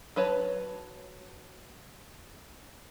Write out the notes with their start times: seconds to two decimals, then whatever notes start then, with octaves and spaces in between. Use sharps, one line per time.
0.16 F#3 B4 C#5 A5